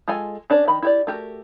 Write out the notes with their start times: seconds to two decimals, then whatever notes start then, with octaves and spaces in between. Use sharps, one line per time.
0.08 G#3 F4 A4 G#5
0.50 C#4 D4 A#4 C#5
0.67 D#3 B5
0.82 E4 G4 D5
1.07 A3 F#4 G4 A#4